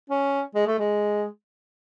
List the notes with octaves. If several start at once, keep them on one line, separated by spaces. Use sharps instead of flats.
C#4
G#3
A3
G#3